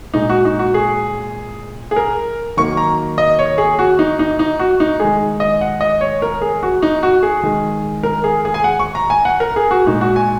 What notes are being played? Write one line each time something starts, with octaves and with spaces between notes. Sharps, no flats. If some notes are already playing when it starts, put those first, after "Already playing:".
A#2 G#3 D#4
F#4
D#4
F#4
G#4
G#4
A#4
D#3 F#3 A#3 C#6
A#5
D#5
C#5
G#4
F#4
D#4
D#4
D#4
F#4
D#4
D#3 G#3 G#4
D#5
F#5
D#5
C#5
A#4
G#4
F#4
D#4
F#4
G#4
D#3 G#3
A#4
G#4
G#4
G#5
F#5
C#6
A#5
G#5
F#5
A#4
G#4
F#4
A#2 G#3 D#4
F#4
G#5